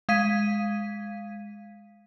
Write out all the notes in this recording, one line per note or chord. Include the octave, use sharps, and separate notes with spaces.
G#3 F5 G#6 B6 D#7